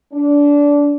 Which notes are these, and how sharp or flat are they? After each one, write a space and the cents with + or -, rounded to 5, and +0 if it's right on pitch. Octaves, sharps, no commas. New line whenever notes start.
D4 -20